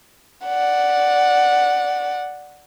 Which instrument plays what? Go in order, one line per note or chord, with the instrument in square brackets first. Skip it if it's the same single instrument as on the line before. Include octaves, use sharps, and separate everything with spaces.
[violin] D5 F#5